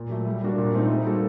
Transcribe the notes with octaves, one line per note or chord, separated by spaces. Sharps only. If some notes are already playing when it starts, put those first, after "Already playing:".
Already playing: A#2
F#3 A3
G3
A#3 D4 F#4 A#4
A#2
A3 C4 D#4
G3
A#3 F#4 A4